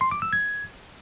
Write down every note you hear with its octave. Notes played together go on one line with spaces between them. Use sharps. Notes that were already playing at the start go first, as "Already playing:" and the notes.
C6
D6
E6
G#6